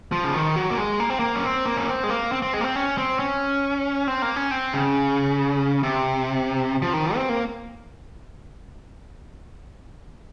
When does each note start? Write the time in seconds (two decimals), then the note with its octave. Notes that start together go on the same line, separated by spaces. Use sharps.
0.12 F3
0.24 C#3
0.34 D#3
0.56 F#3
0.70 A#3
0.77 G#3
1.00 A#3
1.10 C4
1.20 A#3
1.36 C#4
1.44 C4
1.66 A#3
1.77 C#4
1.88 C4
2.04 G#3
2.09 A#3
2.32 C4
2.42 C4
2.53 G#3
2.61 A#3
2.64 C4
2.76 C#4
2.98 C4
3.19 C#4
4.07 C4
4.22 A#3
4.36 C#4
4.51 C4
4.73 C#3
5.83 C3
6.82 F3
6.93 D#3
7.15 C4
7.29 A#3